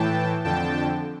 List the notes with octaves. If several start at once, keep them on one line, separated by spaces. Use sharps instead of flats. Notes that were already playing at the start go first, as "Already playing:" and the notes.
Already playing: A2 E3 G5 A5
F2 D3 G5 A5